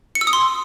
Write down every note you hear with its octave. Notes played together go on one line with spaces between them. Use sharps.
C#7
E6
D#6
C6